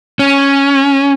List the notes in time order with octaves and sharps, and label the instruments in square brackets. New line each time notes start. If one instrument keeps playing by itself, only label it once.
[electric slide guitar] C#4